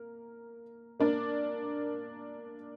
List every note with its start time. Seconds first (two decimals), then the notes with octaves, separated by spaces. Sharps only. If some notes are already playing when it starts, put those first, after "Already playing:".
Already playing: A#3 A#4
1.00 A#3 D4 A#4 D5